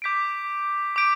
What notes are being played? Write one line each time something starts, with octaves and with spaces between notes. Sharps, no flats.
D6 G6 B6 D7
D6 G6 B6 D7